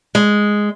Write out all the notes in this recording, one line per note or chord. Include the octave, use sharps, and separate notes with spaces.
G#3